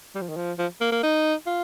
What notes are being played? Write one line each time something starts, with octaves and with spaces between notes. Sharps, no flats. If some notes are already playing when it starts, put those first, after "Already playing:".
G3
F3
D#3
F3
F3
A#3
A#3
D#4
F4